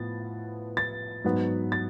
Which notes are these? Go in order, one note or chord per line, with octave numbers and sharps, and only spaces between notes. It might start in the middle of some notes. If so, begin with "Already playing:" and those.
Already playing: A2 F3 B3 A6
A6
G#2 F#3 B3
A6